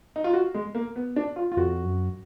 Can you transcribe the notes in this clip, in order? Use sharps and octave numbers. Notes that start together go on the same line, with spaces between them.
D#4
F4
F#4
G#3
A#3
B3
D4
F4
F4
F2 F#4
F#2